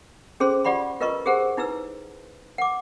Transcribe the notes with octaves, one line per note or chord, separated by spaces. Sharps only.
C#4 G#4 A4 C5 C6
F4 G4 D5 F#5 B5 C6
F4 A#4 B4 D#5 A#5 C#6
G4 G#4 A#4 C5 F#5
D#4 E4 B4 E6
F#5 D6